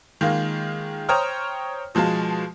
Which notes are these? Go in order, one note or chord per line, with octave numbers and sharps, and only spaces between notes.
D#3 G#3 A#3 F4
C5 C#5 G5 A#5 D#6 F6
B2 F3 G#3 F4 A5